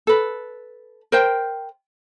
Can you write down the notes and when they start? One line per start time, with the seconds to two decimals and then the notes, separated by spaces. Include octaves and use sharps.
0.07 A4 B4
1.12 A#4 C5 G5